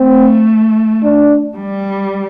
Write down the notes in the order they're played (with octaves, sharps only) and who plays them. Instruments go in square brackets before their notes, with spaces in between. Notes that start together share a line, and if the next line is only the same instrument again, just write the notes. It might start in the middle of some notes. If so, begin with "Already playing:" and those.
Already playing: [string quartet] A3 [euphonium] C4
[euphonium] D4
[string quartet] G3